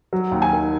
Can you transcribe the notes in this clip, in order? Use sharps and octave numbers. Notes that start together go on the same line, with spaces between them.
F#3
D#2
G#5
D#3